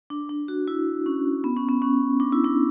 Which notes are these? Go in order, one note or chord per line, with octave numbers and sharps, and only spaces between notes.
D4
D4
F#4
E4
C#4
B3
C#4
B3
C#4
D4
E4
D4